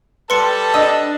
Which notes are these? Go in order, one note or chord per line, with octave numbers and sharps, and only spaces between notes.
G3 A4 B4 A5 C6 C#7
D4 D#5 E6